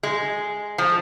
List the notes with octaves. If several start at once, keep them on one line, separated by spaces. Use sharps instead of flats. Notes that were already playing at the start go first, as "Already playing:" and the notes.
G#3
F3